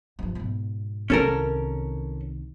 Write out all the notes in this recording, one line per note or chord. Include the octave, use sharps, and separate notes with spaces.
G2 F3
G#2 B2
C2 D#3 C#4 A4 A#4